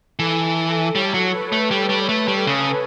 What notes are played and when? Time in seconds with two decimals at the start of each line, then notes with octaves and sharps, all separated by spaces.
0.19 E3 A4
0.57 A4
0.95 G3 C#5
1.14 F#3
1.33 B4
1.52 A3
1.71 G3
1.89 G3
2.09 A3
2.28 G3
2.47 C#3